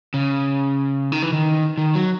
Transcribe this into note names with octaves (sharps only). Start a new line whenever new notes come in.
C#3
D#3
E3
D#3
D#3
F#3